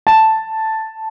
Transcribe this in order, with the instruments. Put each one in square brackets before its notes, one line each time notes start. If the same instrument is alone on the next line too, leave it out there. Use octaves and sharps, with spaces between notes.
[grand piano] A5